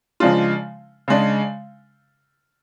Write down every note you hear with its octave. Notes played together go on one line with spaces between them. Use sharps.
C#3 F3 G#3 D4 F4
C#3 G#3 D4